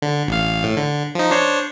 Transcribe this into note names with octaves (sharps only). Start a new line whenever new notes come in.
D3
A1 F5
A2
D3
F3 D#4
D4 C5 C#5